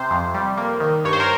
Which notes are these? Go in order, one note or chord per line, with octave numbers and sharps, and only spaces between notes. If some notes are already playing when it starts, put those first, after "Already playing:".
Already playing: C3 C5
F2
G3
A#3
D#3
G2 C#5
C5
A#4